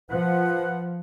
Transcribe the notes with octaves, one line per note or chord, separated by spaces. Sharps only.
F3 B4 F#5